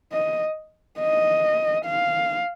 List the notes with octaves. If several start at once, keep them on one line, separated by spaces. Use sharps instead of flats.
D#5
D#5
F5